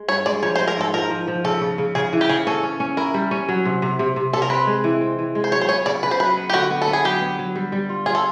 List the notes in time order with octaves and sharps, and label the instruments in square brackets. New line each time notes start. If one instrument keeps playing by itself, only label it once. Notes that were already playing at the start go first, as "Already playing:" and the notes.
Already playing: [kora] G#3
[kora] G2 [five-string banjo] C#5
[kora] G#3 [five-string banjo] D5
[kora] F3 [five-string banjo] C#5
[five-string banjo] C5
[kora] G#3
[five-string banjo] A#4
[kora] G#2 [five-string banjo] A4
[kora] F3 [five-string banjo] A#4
[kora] F3
F3
[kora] C#3 [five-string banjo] A4
[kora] C#3
C#3
[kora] C#3 [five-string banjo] G#4
[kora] E3
[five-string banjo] G4
[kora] C#3 [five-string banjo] G#4
[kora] C#4 [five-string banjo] A4
[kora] C#4
C#4
[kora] E4 [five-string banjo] A#4
[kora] G3
C#4
F#3
C3
C3
C3
C3
[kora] C3 [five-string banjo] A4
[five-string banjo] A#4
[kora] C4 [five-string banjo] B4
[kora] G#3
E3
C4
E3
G#3
[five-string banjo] C5
[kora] F#3 [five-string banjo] C#5
[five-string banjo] C5
[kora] B3 [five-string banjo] C#5
[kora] C#3 [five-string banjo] D5
[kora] C#3 [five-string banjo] B4
[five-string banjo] C5
[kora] F#3 [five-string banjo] B4
[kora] B3
[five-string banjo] G4
[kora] D3 [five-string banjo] F#4
[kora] B3
[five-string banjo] A4
[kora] B3
[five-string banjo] G#4
[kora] F#3 [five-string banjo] G4
[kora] B3
F#3
G3
G3
F4
[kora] F4 [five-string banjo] G#4
[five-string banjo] A4